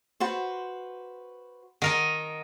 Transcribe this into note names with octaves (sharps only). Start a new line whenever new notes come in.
F#4 B4 C5
D#3 A#4 D#5 F#5